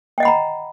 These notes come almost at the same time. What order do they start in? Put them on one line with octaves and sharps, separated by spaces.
G5 D#5 F#5 B5 A#5